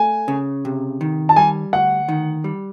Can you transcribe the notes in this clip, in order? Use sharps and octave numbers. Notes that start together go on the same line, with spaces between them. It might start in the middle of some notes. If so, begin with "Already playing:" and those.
Already playing: A3 G#5
C#3
C3
D#3
A5
G3 G#5
D2 F#5
D#3
G3